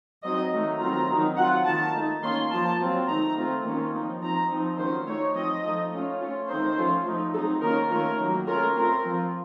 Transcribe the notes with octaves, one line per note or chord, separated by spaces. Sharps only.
F#3 C4 D#4 D#5
D#3 F#3 A3 D#4
D#3 F#3 A3 C4 F4 A#5
D#3 F#3 C4 D#4
F#3 C4 F4 F#5
D#3 A#3 F4 A5
A3 D#4
D#3 A#3 C#4 F4 C6
F3 A#3 F4 A5
F#3 C4 F4
D#3 A3 D#4 A#5
A3 C4 F4
D#3 A#3 C#4 F4
F3 C4 D#4
F3 C4 D#4 A#5
F3 C4 D#4
D#3 F#3 A3 C#4 F4 C5
A3 D#4 C#5
F3 C4 D#4 D#5
F3 A3 D#4
A3 C#4 F4
A3 C#4 F4
D#3 A3 C4 D#4 C5
F3 A3 C#4 F4
F3 A3 D#4
F#3 C4 D#4 A4
D#3 A#3 C#4 F4 A#4
D#3 A3 C#4 F4 A#4
D#3 F#3 A#3
A3 C#4 F4 A#4
A3 C4 F4 A#4
F3 C4 F4